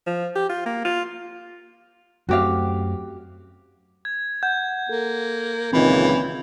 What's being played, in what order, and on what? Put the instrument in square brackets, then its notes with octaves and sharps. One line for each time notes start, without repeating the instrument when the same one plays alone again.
[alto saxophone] F3
G4
F4
A#3
F4
[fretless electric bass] F#2 A3 C4 [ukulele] F#4 G4 F5
[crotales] G#6
[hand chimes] F#5 [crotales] G6
[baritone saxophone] A#3 [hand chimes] A4
[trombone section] C#2 A#2 D#3 [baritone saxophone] E3 [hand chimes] C4 B5